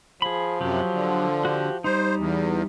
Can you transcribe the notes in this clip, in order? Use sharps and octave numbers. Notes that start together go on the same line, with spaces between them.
F3 G#4 B5
F#2 C3 F#3 G4
D3
F#4 G4
G3 D#4 C5
E2